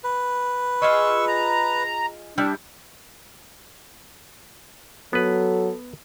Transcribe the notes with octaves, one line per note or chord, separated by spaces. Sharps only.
B4
F4 G#4 D#5 C#6 E6
A#5
G3 D4 E4
F#3 B3 A4 B4